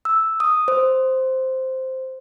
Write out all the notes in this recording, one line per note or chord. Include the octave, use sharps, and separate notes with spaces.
E6
D#6
C5